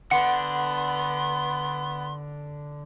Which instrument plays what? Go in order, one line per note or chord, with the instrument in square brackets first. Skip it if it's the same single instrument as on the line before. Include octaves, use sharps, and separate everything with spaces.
[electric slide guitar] D3 [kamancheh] B3 [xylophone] F#5 [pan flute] C6